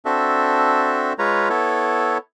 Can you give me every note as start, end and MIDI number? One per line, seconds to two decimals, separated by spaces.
0.05 1.13 60
0.05 1.13 62
0.05 1.13 66
0.05 1.13 69
0.05 1.13 76
1.19 1.49 56
1.19 1.49 65
1.19 1.49 71
1.19 1.49 73
1.19 1.49 82
1.50 2.18 59
1.50 2.18 64
1.50 2.18 69
1.50 2.18 73